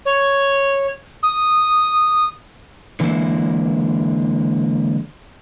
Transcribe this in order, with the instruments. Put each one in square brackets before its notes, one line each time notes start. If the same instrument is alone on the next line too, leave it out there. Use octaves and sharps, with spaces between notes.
[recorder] C#5
D#6
[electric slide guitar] D3 E3 G#3 A#3 E4